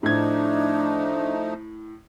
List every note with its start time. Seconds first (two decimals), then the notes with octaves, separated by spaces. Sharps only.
0.03 A2 F3 A3 D4 D#4 G#6